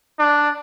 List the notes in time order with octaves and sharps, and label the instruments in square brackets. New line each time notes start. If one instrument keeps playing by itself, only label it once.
[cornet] D4